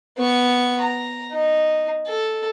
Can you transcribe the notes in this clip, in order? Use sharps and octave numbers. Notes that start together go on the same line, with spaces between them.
B3 C#6
A#5
D#4
A4